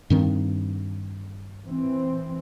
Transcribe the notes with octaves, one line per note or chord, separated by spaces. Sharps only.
G2 D#3 C4
E3 C4